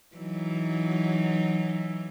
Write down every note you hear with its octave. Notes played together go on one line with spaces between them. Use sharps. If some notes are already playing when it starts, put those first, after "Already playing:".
E3 F#3 D#4